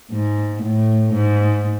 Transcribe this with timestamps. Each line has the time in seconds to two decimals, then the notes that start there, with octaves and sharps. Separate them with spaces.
0.12 G#2
0.63 A2
1.14 G#2